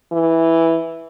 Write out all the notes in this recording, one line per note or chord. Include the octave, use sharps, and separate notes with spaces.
E3